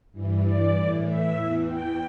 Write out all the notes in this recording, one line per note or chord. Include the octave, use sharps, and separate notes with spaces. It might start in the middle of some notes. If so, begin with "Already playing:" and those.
G2 E3
D5
A2 E3
E5
E2 E3
G5